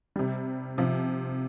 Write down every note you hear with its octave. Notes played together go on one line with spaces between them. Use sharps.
C3 G3
C3 F3